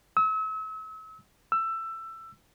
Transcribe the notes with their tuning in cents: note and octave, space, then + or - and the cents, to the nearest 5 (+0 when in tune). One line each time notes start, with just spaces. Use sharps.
E6 -40
E6 +15